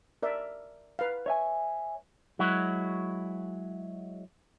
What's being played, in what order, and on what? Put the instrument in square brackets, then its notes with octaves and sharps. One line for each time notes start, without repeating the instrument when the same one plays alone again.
[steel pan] A#4 D5 E5
B4 F5
[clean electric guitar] C#5 E5 G#5
F#3 G#3 E4 F#4